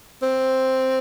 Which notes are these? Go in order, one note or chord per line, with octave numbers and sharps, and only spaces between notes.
C4